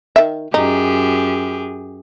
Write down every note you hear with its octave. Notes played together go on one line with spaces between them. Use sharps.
D#3 E5
F#2 D#4 G4 G#4